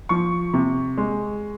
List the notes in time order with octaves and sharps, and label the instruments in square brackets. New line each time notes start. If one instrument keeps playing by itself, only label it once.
[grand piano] F3 C#6
C3
G#3